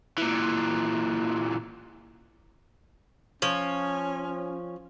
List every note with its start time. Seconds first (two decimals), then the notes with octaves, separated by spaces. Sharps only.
0.18 A#2 E3
3.42 F3 C#4 C#5